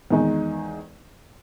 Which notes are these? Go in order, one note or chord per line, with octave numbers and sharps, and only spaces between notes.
E2 D#3 G#3 D#4